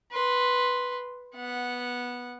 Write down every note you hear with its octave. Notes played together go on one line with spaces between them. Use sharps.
B4 C6
B3 F#5